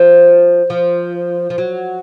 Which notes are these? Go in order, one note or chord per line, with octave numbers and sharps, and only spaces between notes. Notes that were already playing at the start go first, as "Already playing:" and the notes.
Already playing: F3
F3
F3
F#3